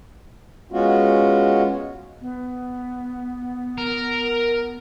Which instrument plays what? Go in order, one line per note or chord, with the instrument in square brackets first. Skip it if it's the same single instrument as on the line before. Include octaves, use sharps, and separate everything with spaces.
[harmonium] G#3 B3 C#4 F4 F#4
[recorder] B3
[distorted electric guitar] A#4